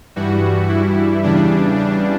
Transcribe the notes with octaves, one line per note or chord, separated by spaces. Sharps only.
G2 E3 G3 F#4
E4
E2 C#3 E3 G3 D4
D4